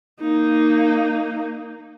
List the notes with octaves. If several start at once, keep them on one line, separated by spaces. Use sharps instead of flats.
A#3 D#4